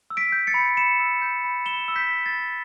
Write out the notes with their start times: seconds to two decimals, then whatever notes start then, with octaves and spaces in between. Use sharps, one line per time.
0.10 E6
0.17 B6 D7
0.32 G6
0.47 A6 C#7
0.54 B5
0.77 B5 C#7 E7
1.00 E6
1.22 G6
1.44 B5
1.66 B5 E7 G7
1.88 E6
1.96 G6 B6
2.11 G6
2.26 A6
2.32 B5